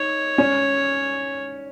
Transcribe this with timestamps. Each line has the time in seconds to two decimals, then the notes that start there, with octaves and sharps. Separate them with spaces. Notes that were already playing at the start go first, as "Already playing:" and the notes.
Already playing: D#4 C#5
0.38 C#4